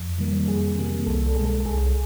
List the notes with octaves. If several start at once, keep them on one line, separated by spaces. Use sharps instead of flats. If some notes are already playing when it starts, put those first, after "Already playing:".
Already playing: F2
C3 D#3 G3 A#3
F2 G#4
C3 D#3 G3 A#3
C2 A4
A4
B2 G#3 G#4
A4
A4
C2 G#4